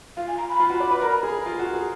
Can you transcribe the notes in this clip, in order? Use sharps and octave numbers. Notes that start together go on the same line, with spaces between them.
F4 F5
G#5
A#5
B5
F4
F#4
D5
B4
A#4
G#4
F4
F#4
G#4